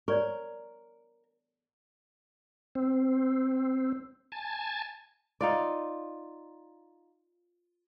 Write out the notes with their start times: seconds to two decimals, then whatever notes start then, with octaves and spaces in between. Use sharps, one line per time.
0.08 A#4 C#5 D5 C#6
2.75 C4
4.32 G#5 A5
5.41 D#4 F4 D5